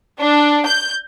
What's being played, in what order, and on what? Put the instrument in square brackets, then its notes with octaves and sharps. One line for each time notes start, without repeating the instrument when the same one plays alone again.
[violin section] D4
G6